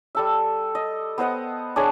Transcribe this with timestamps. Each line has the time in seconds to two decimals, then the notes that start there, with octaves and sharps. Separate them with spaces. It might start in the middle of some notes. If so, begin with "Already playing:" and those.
0.15 G3 A4 E5
0.75 D#5
1.18 B3 C5 D#5 F#5
1.76 D4 G#4 C#5 D#5